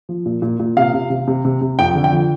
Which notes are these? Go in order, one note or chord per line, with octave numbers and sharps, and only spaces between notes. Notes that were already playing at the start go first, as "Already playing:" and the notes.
F3
A#2
A#2
A#2
C3 F5
C3
C3
C3
C3
C3
F2 G5
D3
G5
F3